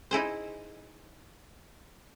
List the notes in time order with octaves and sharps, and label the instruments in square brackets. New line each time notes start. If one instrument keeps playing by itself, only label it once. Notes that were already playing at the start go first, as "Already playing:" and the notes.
[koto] D#4 E4 G#4 C5